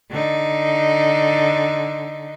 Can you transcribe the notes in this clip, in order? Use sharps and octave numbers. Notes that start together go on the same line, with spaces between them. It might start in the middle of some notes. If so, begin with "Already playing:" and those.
D3 D#4